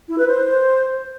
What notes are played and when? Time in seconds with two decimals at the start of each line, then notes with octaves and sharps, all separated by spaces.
0.08 E4
0.18 B4
0.28 C5